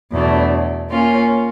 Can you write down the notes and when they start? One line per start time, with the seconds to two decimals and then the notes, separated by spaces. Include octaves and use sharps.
0.12 E2 B2 F#3 A3 D4
0.90 A#3 C#4 F4